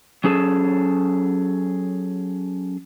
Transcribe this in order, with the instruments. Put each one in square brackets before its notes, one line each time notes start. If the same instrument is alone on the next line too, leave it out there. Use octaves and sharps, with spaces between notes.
[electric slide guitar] F#3 C#4 G#4 A4